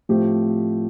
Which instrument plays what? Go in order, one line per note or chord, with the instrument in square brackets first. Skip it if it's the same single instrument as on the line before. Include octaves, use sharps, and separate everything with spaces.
[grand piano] A2 F3 A3 C4 G4